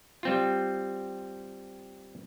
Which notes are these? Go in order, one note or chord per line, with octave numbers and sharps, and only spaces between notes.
G3 C4 F4